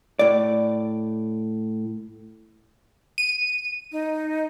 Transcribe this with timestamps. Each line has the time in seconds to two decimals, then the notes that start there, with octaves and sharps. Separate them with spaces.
0.19 A2 D5
3.18 D#7
3.92 D#4